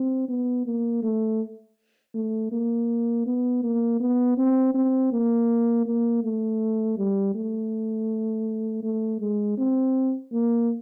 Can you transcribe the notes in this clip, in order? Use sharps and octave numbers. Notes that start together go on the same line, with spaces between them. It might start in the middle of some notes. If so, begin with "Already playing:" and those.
Already playing: C4
B3
A#3
A3
A3
A#3
B3
A#3
B3
C4
C4
A#3
A#3
A3
G3
A3
A3
G#3
C4
A#3